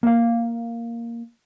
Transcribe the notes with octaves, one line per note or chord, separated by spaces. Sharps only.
A#3 F5